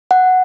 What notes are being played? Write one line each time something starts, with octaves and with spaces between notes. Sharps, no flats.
F#5